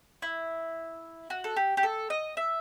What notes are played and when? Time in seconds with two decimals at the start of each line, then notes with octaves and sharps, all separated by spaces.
0.22 E4
1.30 F#4
1.44 A4
1.56 G4
1.77 G4
1.83 A4
2.10 D#5
2.37 E5